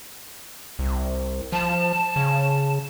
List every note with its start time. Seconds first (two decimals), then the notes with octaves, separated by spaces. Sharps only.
0.79 C2
1.52 F3 A5
2.16 C#3